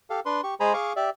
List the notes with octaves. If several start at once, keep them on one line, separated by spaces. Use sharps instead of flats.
G4 A4 F5
D4 B4 C6
G4 C#6
G#3 G#4 C5 G#5 A#5 B5
G#4 F5 C#6 D6
G4 D5 E5